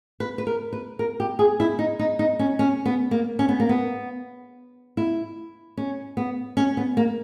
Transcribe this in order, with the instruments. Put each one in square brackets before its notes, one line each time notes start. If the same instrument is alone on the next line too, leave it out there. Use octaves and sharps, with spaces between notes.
[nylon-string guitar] B4
B4
A#4
B4
A#4
G4
G#4
E4
D#4
D#4
D#4
C#4
C#4
B3
A#3
C#4
B3
A#3
B3
E4
C#4
B3
C#4
B3
A#3